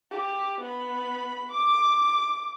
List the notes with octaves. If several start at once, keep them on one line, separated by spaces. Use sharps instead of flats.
G4
B3 B5
D6